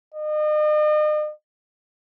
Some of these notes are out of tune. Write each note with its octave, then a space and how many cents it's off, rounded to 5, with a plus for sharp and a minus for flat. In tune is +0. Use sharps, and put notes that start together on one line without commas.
D#5 -40